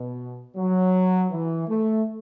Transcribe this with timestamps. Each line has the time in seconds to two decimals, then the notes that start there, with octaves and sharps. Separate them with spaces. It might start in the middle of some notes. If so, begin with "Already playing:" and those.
Already playing: B2
0.56 F#3
1.31 E3
1.68 A3